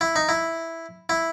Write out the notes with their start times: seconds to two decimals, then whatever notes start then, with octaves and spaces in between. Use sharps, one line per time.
0.01 E4
0.16 D#4
0.29 E4
1.09 E4